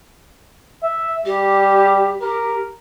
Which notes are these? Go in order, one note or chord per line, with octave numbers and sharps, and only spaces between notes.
E5
G3 G4
G4 A#4